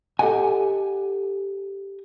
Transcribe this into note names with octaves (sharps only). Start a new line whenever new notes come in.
G4 A4 D#5 F#5 G#5